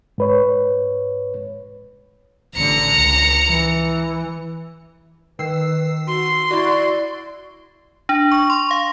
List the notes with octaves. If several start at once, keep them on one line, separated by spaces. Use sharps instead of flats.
G#2 B4 C#5
A1 D3 A#5 C#7
C#2
E3
D#3 B4 E6 C7
F#4 C6
E4 F#4 D5 C#6
D4
C#6
C6
F5